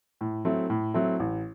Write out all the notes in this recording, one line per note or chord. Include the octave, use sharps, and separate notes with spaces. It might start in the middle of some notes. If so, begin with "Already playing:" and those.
A2
F#3 A3 C4 E4
A2
F#3 A3 C4 E4
A1